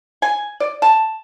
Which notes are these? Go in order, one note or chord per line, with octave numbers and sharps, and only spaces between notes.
G#5
D5
A5